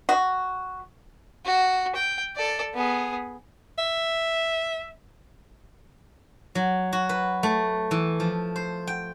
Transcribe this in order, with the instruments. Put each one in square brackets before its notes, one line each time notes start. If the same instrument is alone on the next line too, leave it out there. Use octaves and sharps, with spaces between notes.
[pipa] F#4
[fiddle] F#4
G5
A4 D5
B3 G#4
[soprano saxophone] E5
[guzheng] F#3
F#4
B4
A3
E3
F3
C5
G5